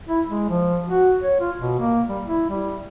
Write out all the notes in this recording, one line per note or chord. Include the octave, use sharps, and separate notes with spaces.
E4
G#3
F3
F#4
C#5
F4
B2
A#3
G3
E4
G3